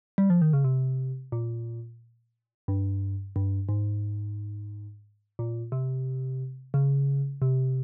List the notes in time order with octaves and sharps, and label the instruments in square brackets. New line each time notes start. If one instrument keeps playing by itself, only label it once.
[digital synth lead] G3
F3
D#3
C#3
C3
A#2
G2
G2
G#2
A#2
C3
C#3
C3